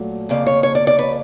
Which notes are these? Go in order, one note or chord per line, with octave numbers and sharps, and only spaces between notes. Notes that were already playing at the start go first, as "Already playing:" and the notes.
Already playing: A#2 F#3 A3
F2 C#3 F3 A#3 D5
C#5
C#5
D5
D5
B4